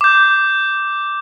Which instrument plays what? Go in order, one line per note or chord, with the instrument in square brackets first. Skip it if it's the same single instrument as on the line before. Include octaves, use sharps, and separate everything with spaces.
[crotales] D6 G6